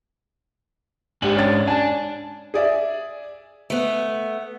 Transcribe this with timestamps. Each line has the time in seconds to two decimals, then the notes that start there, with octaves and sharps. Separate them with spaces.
1.22 G#2 D4 G4 G#5 F#7
1.35 C#4 A6
1.68 D4 G#5 A5
2.54 G#4 D5 E5
3.70 A3 B3